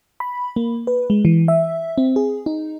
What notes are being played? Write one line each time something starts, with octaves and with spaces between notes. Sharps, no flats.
B5
A#3
B4
G#3
E3
E5
C4
G#4
D#4